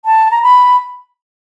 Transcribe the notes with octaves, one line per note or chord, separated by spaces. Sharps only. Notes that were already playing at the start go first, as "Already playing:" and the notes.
A5
A#5
B5